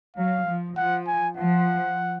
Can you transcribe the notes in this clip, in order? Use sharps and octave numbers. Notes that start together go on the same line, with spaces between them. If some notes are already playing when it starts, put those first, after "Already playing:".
F#3 F5
F3
F3 F#5
G#5
F3 F#5